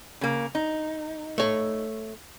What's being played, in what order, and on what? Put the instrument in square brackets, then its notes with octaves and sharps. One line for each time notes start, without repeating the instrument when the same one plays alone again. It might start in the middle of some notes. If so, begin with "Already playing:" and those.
[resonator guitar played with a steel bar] C#3 A#3
D#4
[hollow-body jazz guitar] A3 C#5